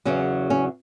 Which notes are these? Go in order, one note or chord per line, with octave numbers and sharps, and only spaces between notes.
E2 C#3 F#3 C#4
C#4